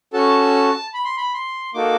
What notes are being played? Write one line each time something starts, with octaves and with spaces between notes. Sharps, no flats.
C#4 F#4 A4 A5
B5
C6
B5
C6
A#3 D#4 F#4 A4 D6